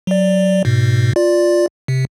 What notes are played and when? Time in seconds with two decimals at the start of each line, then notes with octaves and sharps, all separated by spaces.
0.07 F#3 D5
0.65 G#2 B2
1.16 F4 D5
1.88 C3